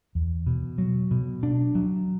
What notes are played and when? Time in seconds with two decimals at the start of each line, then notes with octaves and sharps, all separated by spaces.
0.15 E2
0.46 B2
0.78 F#3
1.11 B2
1.43 D4
1.75 F#3